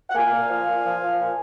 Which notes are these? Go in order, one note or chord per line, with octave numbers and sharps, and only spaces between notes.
F#5
A#3 F5 G#5
A#2
F3
A#2
F3
F3
A#2